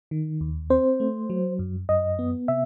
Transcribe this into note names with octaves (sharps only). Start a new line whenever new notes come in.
D#3
D#2
C4 C5
A3
F#3
F#2
F#2 D#5
B3
C3 E5